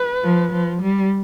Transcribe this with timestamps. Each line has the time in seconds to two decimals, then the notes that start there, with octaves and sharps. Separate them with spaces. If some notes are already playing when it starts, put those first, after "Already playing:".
Already playing: B4
0.24 F3
0.52 F3
0.82 G3